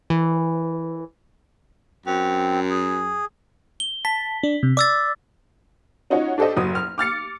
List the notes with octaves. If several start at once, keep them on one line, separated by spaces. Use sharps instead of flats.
E3
F#2 C4
G#4
G7
A5 B6
D4
C3
D5 D6 E6 A6
C#4 D#4 F4 F#4 C#5
D4 G4 A4 C5 D#5
F#1 F#3 D#6
F6
D6 F6 A6 C#7